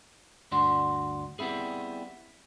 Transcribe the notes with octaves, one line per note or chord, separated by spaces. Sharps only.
D2 G2 D4 F#4 C6
G3 B3 C4 E4 G#4